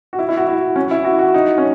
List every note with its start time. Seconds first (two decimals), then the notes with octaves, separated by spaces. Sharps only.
0.13 F#4
0.19 E4
0.29 E4
0.37 F#4
0.47 E4
0.76 C#4
0.91 E4
1.05 F#4
1.19 F#4
1.34 D#4
1.58 C#4